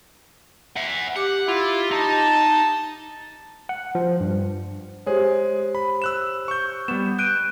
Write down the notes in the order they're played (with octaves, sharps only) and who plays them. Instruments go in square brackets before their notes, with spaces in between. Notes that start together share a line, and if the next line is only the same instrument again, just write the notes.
[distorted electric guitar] E5 F#5
[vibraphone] G4 D6 [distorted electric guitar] F#5
[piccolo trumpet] E4 [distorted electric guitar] F4
[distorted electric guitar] D#4 [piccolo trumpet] A5
[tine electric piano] F#5
F3
G2
[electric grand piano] G#3 G#4 [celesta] G4 C5 C#5
[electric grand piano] B5
E6 F#6 E7
C#6 G6
[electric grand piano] G3 B3 [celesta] E7
[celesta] F#6 D7 D#7 [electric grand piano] G6